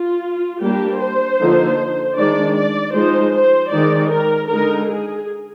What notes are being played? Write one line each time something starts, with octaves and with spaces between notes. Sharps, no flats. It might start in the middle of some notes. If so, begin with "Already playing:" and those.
Already playing: F4
G3 A#3 D4 G4
C5
D3 F3 A#3 D#4
D#3 G#3 D4 D5
D5
F3 G#3 D#4 C5
C5
D#3 G#3 D#4 D5
A#4
D3 G#3 D#4 A#4
G#4